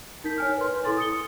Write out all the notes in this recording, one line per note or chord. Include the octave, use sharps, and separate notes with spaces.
D#4 A#4 G6 B6
C#5 G#5 F6
B4 C6
E4 A4 C6 A6
D#6 A6 C#7 G7